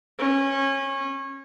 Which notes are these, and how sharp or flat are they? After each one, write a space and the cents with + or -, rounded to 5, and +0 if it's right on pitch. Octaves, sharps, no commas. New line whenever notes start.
C#4 -25